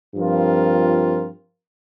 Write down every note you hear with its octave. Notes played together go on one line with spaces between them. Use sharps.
G2 F3 C4 F4 A#4